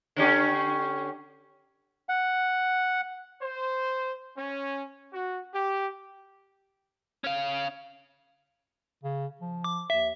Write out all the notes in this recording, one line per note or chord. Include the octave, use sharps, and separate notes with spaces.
D3 C#4 G4
F#5
C5
C#4
F#4
G4
C#4 F5
C#3
F3
D6
D#2 E5